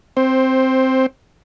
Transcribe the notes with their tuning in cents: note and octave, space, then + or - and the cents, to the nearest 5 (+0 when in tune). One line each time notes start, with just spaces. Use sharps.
C4 +0 C5 +15